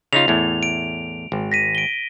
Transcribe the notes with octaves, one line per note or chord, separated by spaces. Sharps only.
C#3 D#4 F4 F7
E2 A2
D7
G#1
A#6 B6 D#7
D7 G7